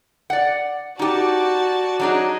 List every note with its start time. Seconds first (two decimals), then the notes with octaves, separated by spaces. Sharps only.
0.30 D5 F#5
0.99 D#4 F#4 G4 D5 A5
1.99 F#3 D4 D#4 G#4